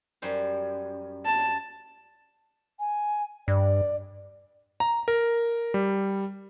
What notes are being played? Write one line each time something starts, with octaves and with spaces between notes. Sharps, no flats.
F#2 G3 C5
A5
G#5
G2 D5
A#5
A#4
G3